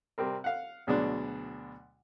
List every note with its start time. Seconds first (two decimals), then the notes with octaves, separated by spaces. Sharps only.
0.18 C3 G3 C4 A#4
0.44 F5 F#5
0.87 D2 B2 F#3 G#3 D4